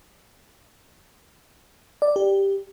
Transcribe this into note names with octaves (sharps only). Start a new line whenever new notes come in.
D5
G4